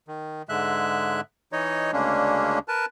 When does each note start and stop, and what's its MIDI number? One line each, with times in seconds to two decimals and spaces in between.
0.08 0.42 51
0.49 1.21 44
0.49 1.21 50
0.49 1.21 56
0.49 1.21 76
0.49 1.21 90
1.52 1.91 52
1.52 1.91 63
1.52 1.91 73
1.52 1.91 75
1.93 2.59 38
1.93 2.59 49
1.93 2.59 56
1.93 2.59 58
1.93 2.59 61
1.93 2.59 62
2.68 2.86 70
2.68 2.86 71
2.68 2.86 81